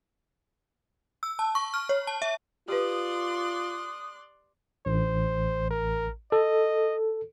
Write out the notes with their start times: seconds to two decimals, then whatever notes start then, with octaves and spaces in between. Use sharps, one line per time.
1.23 E6
1.39 A5
1.55 C#6
1.74 F6
1.89 C#5
2.07 A5
2.22 E5
2.68 F4 G4 B4 D5 C6 D#6 F#6
4.86 A1 C5
5.71 A#4
6.32 A4 D#5